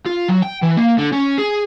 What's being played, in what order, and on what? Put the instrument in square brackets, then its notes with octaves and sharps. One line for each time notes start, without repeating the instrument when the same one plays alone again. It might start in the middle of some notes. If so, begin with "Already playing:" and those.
[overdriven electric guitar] F4
F#3
G5
E3
A#3
D3
C#4
G#4